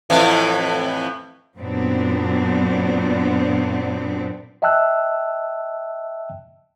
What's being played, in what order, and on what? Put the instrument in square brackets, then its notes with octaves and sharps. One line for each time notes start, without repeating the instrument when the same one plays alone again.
[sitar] F2 A2 E3
[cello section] F#2 A#2 F#3 B3 C4 D4
[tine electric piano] D#5 E5 G5 A5 E6 F#6